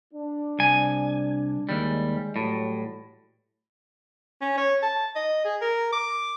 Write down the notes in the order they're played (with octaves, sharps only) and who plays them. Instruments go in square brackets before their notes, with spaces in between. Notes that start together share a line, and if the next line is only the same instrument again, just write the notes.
[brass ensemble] D4
[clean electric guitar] C2 G#5
[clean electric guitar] D#2 G3 [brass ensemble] G#3
[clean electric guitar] A2 [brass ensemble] E3 F#3 G3
[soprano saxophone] C#4
C#5
A5
D#5
G#4
A#4
D6